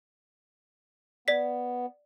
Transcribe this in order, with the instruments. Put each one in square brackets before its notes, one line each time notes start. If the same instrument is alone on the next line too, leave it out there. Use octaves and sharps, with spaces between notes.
[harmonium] B3 [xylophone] D5 B6